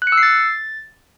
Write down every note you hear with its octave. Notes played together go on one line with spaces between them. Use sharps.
F#6
C#7
E6
C7
A6